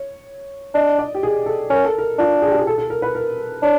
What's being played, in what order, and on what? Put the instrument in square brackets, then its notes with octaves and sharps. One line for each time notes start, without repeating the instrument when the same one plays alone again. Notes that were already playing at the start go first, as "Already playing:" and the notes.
Already playing: [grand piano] C#5
[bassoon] D4 [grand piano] D#5
[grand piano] D5
G4
G#4
A4
[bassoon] C#4 [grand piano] A#4
[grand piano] A4
A#4
[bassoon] D4 [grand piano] F4
[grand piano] G#4
G4
G#4
A4
A4
A#4
B4
A#4
[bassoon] D4 [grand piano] C#5